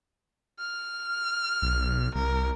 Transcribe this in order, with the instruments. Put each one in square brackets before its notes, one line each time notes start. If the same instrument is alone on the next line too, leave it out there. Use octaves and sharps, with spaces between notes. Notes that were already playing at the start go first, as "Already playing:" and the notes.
[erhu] F6
[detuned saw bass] B1
[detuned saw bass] C2 [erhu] A#4